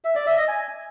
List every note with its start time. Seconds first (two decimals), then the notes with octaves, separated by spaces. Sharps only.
0.04 E5
0.15 D5
0.26 E5
0.37 D#5
0.48 G#5